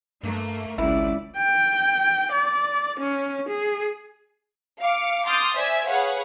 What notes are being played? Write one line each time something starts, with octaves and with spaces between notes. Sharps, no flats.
G2 A3 A#3
G#1 C#2 E4 D5
G5
D5
C#4
G#4
F5 D6 C#7
C6 D6 D#6 F6 G6 A6
C5 D5 E5 G#5
G#4 B4 C#5 F5 F#5